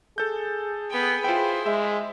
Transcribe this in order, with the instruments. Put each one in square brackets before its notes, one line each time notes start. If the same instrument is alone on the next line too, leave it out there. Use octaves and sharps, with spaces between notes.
[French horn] G#4 [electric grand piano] A4 G6
[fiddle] B3 G5
[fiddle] E4 C5 [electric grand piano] F4 G5
[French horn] G#3 [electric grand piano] E5